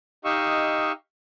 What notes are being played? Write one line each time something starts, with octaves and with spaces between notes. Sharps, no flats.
D#4 G4 D#5 F5 C#6 E6